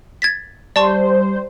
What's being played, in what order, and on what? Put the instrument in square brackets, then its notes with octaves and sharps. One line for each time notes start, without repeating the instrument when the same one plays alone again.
[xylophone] G#6 A6 B6
[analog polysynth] G3 C5 [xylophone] D5 A5 C#6